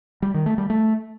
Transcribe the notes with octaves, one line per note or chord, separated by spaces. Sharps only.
G3
D#3
A3
G3
A3